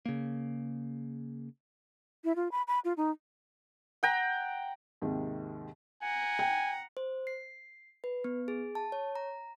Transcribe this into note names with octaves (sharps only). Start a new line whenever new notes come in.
C#3 A#3
E4
F4
B5
B5
F4
D#4
F#5 G5 A#5
D#2 G#2 C3 D#3
F#5 G#5 A#5
G5
C5
C7
B4
B3
G#4
A5
C#5
A#5